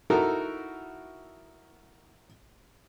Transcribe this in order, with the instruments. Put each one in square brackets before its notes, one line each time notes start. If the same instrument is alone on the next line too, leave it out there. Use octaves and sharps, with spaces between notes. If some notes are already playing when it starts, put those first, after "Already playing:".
[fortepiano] D#4 E4 F#4 A4 A#4